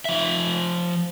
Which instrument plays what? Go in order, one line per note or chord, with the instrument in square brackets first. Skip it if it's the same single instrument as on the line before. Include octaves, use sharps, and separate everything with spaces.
[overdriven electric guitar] F3 E5